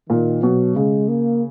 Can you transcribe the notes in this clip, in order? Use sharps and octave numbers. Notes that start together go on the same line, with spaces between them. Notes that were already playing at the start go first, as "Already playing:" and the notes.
A#2 D#3
B2 F#3
C#3 G#3
A#3